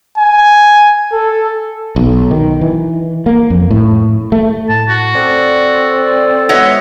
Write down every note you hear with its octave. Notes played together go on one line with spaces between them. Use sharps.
G#5
A4
B1
D#3
E3
A#3
F2
A2
A3
A2 A5
F#4
C4 A4 D5
B2 G#3 C#5 D#5 E5 F#5 C#7